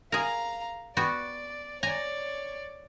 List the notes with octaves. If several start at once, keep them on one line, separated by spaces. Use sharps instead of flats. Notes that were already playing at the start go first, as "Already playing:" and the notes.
G#4 A#4 F5 A#5
B3 F#4 D5 G5
C#5 D5 G#5 A#5